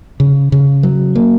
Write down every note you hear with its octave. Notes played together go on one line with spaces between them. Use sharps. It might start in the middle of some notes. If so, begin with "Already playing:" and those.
C#3
C#3
F#3
A#3